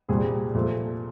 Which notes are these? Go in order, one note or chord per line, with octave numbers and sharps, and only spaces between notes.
C2 A#2 G3 C4 G#4
A#2 F3 A3